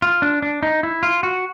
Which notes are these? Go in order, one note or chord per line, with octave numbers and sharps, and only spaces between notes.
F4
D4
D4
D#4
E4
F4
F#4